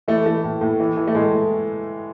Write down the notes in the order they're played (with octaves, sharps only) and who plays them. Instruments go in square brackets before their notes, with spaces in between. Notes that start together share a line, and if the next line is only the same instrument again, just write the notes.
[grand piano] E3 A3
E3 A3
A2
A2
E3
E3
A3
A2 G#3
A2